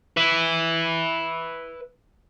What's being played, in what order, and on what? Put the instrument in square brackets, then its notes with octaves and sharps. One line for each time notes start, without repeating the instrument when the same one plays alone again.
[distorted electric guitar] B4 E5